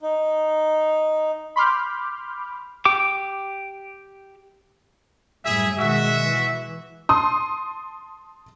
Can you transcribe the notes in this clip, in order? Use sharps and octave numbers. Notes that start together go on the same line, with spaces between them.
D#4
B5 C6 D6 F6 G6
G4 G5 D6
F#2 A2 G3 E4 G#4 E5
B2 D#3 G#3 F#4 E5
E3
A5 C6 D#6